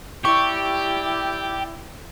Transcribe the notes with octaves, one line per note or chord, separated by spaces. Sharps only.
E4 G4 D5 G5 C#6